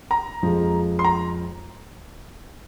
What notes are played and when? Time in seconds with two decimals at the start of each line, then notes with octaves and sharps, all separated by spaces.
0.11 A#5
0.43 F2 F3 G#3
0.99 C6
1.04 A#5